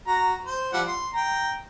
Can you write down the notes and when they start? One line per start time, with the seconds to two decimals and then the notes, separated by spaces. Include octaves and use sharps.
0.07 F#4 A#5
0.45 C5
0.73 F3 G3 F#5
0.88 C6
1.13 G5 A#5